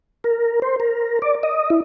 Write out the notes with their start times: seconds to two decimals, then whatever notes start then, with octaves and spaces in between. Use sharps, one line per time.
0.24 A#4
0.62 C5
0.80 A#4
1.22 D5
1.43 D#5
1.70 E4